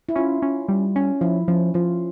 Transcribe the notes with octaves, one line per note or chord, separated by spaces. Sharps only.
E4
C#4 F4
C#4
G3
C#4
F3 E4
F3 C#4
F3 F4